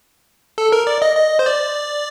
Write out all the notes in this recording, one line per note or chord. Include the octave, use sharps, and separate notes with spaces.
A4
A#4
D5
D#5
D#5
C5
D5